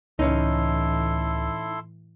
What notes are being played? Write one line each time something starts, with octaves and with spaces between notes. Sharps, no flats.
C#2 A2 E3 C#4 D#4 E4 A4 C6